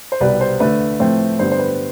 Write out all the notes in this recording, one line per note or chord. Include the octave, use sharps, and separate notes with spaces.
C5
C2 B2 G3 B4 D5
C5
D2 D3 A3 B4
A2 F3 A3 C4
G2 D3 G3 B3 C5
C5
B4